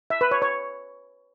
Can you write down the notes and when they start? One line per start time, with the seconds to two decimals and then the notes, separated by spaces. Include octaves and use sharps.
0.10 E5
0.21 B4
0.31 C#5
0.42 C#5